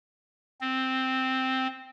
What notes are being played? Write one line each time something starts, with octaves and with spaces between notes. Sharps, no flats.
C4